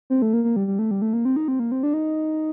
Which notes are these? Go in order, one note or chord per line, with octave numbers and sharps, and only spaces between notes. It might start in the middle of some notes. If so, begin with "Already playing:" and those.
C4
A3
A#3
A#3
G3
G3
A3
G3
A3
A#3
C4
D#4
C4
A#3
C4
D4
D#4